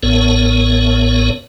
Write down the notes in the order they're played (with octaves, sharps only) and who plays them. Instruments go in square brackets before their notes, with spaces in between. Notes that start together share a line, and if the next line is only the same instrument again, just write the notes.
[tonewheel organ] A1 A2 B3 A#4 C#5